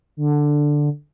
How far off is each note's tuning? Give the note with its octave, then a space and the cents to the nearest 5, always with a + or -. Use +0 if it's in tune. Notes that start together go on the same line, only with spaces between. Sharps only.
D3 +5